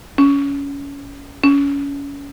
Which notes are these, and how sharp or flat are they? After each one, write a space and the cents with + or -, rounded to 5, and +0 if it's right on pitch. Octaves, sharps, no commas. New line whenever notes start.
C#4 +20
C#4 +25